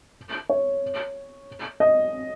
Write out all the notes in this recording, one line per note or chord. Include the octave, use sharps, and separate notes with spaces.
C#5
D#5